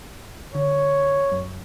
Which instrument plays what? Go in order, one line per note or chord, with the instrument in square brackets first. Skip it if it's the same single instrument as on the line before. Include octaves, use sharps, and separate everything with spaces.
[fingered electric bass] D3 [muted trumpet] C#5
[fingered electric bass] F#2